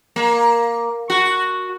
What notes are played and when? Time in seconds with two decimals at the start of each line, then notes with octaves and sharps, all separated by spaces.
0.16 A#3
1.10 F#4